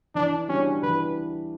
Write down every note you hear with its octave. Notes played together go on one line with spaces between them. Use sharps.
E3 D4
G3 C#4 D4 F#4
E3 B4